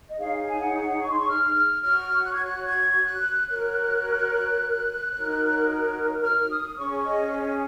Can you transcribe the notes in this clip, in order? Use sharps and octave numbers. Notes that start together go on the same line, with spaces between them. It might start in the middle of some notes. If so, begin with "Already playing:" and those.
D#5
D#4 G#4 C#5 F5
G#5
F#5
C#6
C6
C#6
F6
F6
F#4 C#5 F6
F#6
G#6
F#6
G#6
F#6
F#4 A#4 C#5 F#6
D#4 F#4 A#4 C#5
F6
D#6
C#4 G#4 C#5 C#6
D#5
C#5